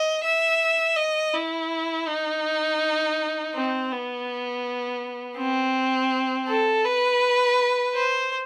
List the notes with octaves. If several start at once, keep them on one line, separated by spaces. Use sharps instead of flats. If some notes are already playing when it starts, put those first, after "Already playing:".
Already playing: D#5
E5
D#5
E4
D#4
C4
B3
C4
A4
B4
C5